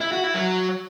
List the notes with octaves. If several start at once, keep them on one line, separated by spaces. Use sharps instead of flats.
E4
F#4
E4
F#3